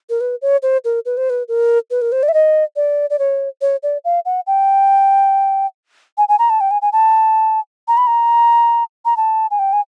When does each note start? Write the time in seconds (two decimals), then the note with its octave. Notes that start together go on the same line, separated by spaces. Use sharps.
0.09 A#4
0.20 B4
0.42 C#5
0.62 C5
0.84 A#4
1.05 B4
1.17 C5
1.30 B4
1.48 A#4
1.91 B4
2.01 A#4
2.12 C5
2.23 D5
2.28 E5
2.34 D#5
2.76 D5
3.10 D5
3.19 C#5
3.61 C#5
3.83 D5
4.04 F5
4.25 F#5
4.47 G5
6.18 G#5
6.28 G#5
6.39 A#5
6.50 A5
6.60 G5
6.71 G#5
6.82 G#5
6.93 A5
7.88 A#5
7.97 B5
8.07 A#5
9.05 A#5
9.17 A5
9.51 G#5
9.59 G5
9.73 G#5